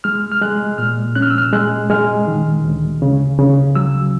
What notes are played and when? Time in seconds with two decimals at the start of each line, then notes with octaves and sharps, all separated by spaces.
0.04 G#3 F6
0.32 F6
0.42 G#3 F#6
0.78 A#2 F6
1.15 C#4 F#6
1.22 F6
1.30 E6
1.38 F6
1.53 G#3 F#6
1.90 G#3 F6
2.27 D#3
2.64 D2
3.02 C#3
3.39 C#3
3.75 F#3 E6